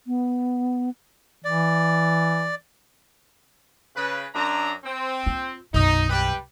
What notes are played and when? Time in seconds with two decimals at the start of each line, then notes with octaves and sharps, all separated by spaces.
0.07 B3
1.45 E3 D5
3.96 C#3 B4
4.35 F#2 D4 A#5
4.84 C4
5.26 F4
5.74 B1 F#2 D#4
6.10 G3 G4 B4